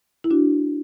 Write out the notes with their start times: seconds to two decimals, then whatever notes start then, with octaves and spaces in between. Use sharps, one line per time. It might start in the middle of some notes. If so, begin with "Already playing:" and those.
0.24 E4
0.31 D4 F#4